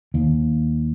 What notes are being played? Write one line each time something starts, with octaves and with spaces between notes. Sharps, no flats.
D#2